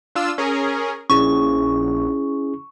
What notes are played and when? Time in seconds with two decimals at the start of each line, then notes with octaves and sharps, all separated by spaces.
0.15 D4 F4 E6
0.38 C#4 G#4 A#4
1.10 A#1 C#4 E4 G#4 C#6